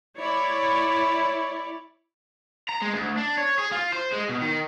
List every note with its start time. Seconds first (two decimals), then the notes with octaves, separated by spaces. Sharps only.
0.18 E4 C#5 D5
2.69 A#5
2.82 G#3
2.93 D2
3.17 D4
3.37 C#5
3.58 G#4
3.72 F4
3.92 C5
4.13 G#3
4.29 B2
4.41 D#3